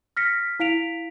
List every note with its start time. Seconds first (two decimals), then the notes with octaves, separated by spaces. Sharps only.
0.17 F6 A#6 B6 C#7
0.60 E4 F5 B6 D7 F7